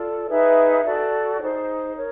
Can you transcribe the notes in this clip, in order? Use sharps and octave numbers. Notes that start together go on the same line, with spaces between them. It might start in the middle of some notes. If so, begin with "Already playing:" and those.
Already playing: F4 A4 D5
D#4 G#4 B4 E5
F#4 A4 D5
D#4 G#4 C5
A#4 C#5